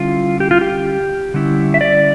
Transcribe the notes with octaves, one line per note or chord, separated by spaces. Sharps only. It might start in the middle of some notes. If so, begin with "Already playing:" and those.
Already playing: D3 G3 C#4 E4 F4
G4
F4
G4
D3 G3 C#4 E4
E5
D5